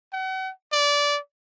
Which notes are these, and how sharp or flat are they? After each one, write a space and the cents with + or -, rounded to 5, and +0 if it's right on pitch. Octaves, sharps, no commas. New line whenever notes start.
F#5 +40
D5 -20